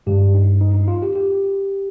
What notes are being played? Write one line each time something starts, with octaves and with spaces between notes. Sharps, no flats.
G2 D#3 G#3 G4
D#4
D#4
D#4
F4
G4
G4